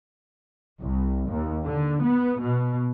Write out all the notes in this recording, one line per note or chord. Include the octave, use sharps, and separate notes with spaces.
C2
D#2
D3
B3
B2